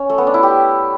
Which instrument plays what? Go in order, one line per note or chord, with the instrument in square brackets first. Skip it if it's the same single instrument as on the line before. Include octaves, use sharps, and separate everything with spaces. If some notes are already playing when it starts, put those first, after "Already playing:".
Already playing: [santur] C#4
A3
B3
D4
E4
G4